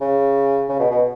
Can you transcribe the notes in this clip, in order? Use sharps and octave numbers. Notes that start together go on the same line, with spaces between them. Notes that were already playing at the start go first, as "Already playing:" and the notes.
C#3
C#3
B2
B2